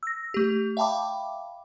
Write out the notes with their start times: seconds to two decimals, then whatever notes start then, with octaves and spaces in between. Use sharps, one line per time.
0.03 E6 A#6
0.34 A3 G4
0.77 E5 F5 G5 A5 B5 D6